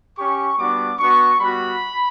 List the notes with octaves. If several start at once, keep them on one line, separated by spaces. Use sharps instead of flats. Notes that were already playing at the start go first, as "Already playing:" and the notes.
C#4 G4 C#6
G3 B3 D4 F#4 D6
B3 D4 F#4 C#6
G3 B3 F#4 B5